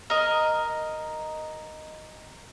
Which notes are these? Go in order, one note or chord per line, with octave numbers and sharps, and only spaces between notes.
A#4 D#5